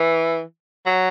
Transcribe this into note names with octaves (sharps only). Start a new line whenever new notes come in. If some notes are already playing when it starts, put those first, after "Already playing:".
Already playing: E3
F#3